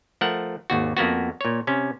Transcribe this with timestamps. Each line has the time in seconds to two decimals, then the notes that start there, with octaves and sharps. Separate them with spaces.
0.21 F3 A3 A#4 F#5
0.70 G#1 D#2 F#4
0.97 F2 A#3 B3 F#4
1.41 A#2 C#5
1.67 C3 C#4